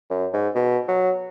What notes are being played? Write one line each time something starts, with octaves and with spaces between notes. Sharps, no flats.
F#2
G#2
B2
F#3